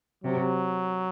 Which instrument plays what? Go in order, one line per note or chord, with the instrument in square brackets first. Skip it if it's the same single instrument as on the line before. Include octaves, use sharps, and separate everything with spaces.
[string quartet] C3 [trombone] F#3